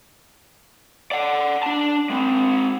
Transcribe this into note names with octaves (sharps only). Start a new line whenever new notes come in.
D5 F#5
D4 A5
G#3 C4